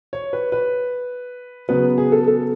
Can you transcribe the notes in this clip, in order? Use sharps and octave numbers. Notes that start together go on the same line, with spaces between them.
C#5
B4
B4
C#3 F#3 B3 B4
G#4
A4
A4